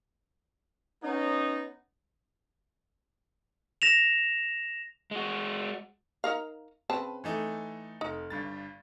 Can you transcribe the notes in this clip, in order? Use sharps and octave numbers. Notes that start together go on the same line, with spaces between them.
B3 C#4 D#4
A#6 E7 F7
G#3 F#4
D#4 A#4 F5
C#3 C4 B4 A5
E3 A3 D#4
F1 D#4
G1 G2 A6